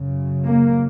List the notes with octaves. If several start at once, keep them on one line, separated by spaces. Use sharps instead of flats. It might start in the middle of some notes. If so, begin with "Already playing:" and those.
Already playing: F#2 C#3
A#3